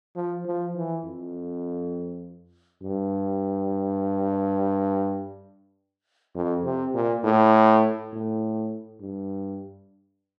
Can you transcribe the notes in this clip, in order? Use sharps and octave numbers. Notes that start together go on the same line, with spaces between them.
F3
F3
E3
F2
G2
F2
C3
A#2
A2
A2
G2